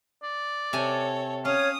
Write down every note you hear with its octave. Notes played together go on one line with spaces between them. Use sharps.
D5
C3 A4 C#5 G#5
C#4 C#5 F5 D#6